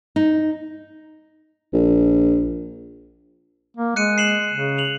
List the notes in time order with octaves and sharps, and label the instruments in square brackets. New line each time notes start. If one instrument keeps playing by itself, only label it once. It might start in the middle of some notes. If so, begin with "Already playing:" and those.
[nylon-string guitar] D#4
[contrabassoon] A#1
[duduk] A#3
[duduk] G#3 [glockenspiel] F#6 C#7 D#7
[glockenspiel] C7 E7 F#7
[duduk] C#3
[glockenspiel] F7 F#7